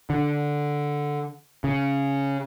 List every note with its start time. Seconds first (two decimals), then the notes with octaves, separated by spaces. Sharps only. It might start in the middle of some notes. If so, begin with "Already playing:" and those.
0.10 D3
1.64 C#3